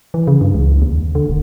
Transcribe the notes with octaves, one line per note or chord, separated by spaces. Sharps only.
E3
C#3
G2
C#2
D#2
D3
E1